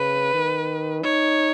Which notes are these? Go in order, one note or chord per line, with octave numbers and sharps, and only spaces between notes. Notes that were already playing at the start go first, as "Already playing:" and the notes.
Already playing: C#3 B4
D#3
D#4 C#5